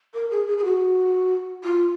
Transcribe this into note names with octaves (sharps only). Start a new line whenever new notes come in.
A#4
G#4
G#4
G#4
F#4
F4